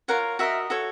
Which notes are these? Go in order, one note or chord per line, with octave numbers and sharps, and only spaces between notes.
F4 A#4 C#5 F#5
F#4 A#4 D#5 E5
F#4 A4 C#5